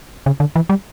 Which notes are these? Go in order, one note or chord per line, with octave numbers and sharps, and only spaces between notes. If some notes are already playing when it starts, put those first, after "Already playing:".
C#3
D3
E3
G3